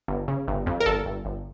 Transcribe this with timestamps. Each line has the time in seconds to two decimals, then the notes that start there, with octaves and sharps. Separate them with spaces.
0.08 G1
0.28 C#3
0.48 G1
0.66 F2
0.80 A#4
0.86 G1 A4
1.06 G1
1.25 G1